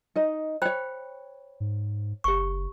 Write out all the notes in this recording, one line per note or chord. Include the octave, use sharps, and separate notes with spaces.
D#4 D#5
C5 C#5 G5 B5
G#2
F#1 G4 C#6